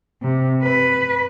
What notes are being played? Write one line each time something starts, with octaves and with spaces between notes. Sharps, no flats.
C3
B4